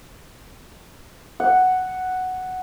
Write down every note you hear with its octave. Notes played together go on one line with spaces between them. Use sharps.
F#5